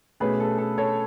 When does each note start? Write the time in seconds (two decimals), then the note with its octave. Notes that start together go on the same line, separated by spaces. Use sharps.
0.20 B2 A3 C#4 G#4 B4
0.40 A4
0.58 A4
0.78 A4 C#5